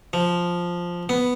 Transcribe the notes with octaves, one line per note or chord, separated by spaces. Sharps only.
F3
B3